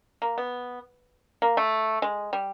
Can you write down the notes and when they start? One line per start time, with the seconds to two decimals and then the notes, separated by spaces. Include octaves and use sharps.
0.22 A#3
0.38 B3
1.42 A#3
1.57 A3
2.02 G#3
2.33 G3